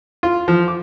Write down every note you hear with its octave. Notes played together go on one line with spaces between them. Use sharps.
F4
F3
D6